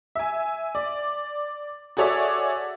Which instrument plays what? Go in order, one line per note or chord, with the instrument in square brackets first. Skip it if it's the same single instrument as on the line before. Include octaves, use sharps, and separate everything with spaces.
[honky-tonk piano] E5 G#5
D5
F#4 G#4 A4 C#5 D5 E5